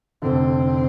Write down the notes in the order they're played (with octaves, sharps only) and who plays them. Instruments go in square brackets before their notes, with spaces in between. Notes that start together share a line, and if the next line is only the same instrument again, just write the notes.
[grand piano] F1 F2 D3 [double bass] C4